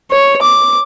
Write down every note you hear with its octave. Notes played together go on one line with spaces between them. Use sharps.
C#5
D6